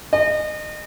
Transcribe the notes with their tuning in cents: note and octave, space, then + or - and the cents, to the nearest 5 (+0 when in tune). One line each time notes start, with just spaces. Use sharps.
D#5 -30